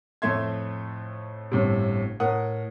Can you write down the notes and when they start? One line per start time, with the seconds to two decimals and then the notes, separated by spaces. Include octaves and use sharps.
0.22 F2 A2 A3 E5 C6 G#6
1.51 G1 A2 C3
2.20 A2 A#4 F#5 D#6